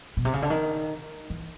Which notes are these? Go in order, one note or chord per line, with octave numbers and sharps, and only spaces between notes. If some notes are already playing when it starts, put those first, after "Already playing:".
B2
C3
C#3
D3
D#3
E3